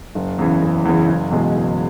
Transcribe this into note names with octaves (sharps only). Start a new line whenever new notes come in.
F#1
E2 C#3 E3
F#1
E2 C#3 E3
F#1
E2 B2 G#3
F#1